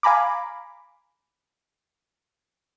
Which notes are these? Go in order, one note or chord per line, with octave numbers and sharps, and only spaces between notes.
F5 G#5 A#5 B5 D6